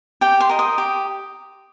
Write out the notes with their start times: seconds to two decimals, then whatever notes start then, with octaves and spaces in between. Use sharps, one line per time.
0.21 G4 G5
0.40 C6
0.49 A#4 D#5
0.59 D#6
0.78 G4